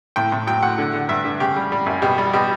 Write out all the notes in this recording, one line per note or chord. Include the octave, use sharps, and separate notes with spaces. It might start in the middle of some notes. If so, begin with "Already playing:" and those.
A2 G5
A2
F#3 G5
A2 F#5
D3
D3
G2 E5
D3
C#3 G4
G3
G3
F#2
B2 G4
G3
B2 G4